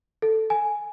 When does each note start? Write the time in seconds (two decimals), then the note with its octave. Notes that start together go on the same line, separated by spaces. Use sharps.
0.22 A4
0.50 G#5